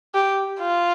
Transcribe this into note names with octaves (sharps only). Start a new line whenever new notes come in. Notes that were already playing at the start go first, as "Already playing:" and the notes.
G4
F4